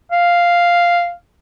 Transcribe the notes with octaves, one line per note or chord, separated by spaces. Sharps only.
F5